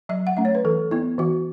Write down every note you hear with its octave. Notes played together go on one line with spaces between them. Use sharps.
F#3 E5
F#5
A3 C#4 E5
C#5
B4
E3 A4
B3 E4
E3 F#4